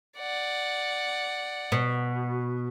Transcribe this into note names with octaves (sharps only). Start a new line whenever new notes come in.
D5 F#5
B2